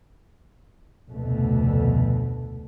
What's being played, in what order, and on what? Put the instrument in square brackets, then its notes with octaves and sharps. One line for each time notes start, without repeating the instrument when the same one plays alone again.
[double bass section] F1 D2 B2 A3